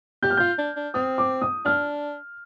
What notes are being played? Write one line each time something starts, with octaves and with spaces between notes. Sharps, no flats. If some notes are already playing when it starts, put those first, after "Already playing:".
G4 G6
F6
F4 G6
D4
D4
C4 D#6
D6
D#6
D4 F6